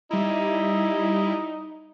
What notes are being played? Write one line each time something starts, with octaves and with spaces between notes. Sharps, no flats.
G3 D#4 E4